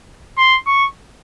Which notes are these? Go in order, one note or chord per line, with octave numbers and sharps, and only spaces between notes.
C6
C#6